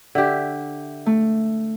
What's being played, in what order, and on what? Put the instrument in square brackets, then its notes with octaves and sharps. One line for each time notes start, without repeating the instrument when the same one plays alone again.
[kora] D3 G4 [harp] E5
[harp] A3